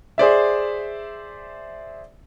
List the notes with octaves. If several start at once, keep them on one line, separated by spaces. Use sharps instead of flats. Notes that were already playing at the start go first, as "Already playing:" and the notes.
G#4 C5 D5 E5